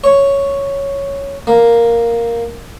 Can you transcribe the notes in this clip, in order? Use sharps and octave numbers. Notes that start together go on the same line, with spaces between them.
C#5
A#3